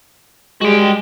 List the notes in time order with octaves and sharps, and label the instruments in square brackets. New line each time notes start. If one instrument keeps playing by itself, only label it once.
[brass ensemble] G3 G#3 [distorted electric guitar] F#4 G5